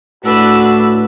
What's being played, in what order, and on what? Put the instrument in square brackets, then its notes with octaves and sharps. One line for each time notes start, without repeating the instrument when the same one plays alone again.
[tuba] A2 [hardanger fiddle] D4 B4 [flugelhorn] F#4 [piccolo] E6